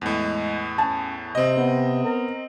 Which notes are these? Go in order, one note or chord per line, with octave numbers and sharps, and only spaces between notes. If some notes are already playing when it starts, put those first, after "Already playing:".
E2 A2 G#3
C#4 A5
C3 C4 D#5
B3
A#4